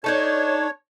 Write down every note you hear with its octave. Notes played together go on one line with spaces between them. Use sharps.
D4 D#4 A4 C#5